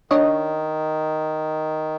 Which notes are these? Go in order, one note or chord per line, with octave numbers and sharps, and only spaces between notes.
D#3 D4 C#5 D#5